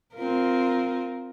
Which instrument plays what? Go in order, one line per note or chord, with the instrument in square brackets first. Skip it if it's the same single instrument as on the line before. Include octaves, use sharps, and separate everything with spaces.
[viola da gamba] C4 F4 A#4